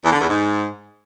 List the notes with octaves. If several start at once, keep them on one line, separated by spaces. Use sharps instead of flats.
E2
D3
E2
G#2